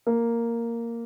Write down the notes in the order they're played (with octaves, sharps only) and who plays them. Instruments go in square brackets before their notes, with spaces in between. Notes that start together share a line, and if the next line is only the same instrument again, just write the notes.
[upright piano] A#3